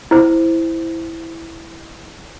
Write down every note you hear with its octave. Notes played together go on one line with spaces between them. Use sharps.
E4 C5